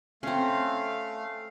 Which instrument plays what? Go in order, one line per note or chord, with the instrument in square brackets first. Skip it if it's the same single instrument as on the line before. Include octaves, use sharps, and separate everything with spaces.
[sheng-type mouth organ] A3 F5 [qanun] C4 C#4